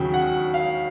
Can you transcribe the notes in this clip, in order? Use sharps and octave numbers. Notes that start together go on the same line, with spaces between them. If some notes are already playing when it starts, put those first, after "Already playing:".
Already playing: D#2 C#3 F#3 G5
F#5
F5